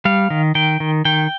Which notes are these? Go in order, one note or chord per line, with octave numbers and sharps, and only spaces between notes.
G3 F5
D#3
D#3 G5
D#3
D#3 G5